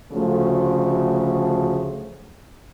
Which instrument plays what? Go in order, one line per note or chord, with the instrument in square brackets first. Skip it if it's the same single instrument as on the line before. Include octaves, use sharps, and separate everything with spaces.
[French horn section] D2 C#3 F3 F#3 A3